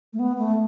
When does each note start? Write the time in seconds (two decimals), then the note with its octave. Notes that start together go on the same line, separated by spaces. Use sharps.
0.13 A3
0.19 B3
0.38 A3